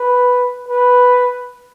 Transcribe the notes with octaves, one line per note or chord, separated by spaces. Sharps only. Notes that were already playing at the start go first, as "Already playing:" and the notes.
Already playing: B4
B4